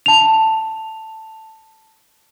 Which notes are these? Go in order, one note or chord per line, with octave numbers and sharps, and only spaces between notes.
A5 F7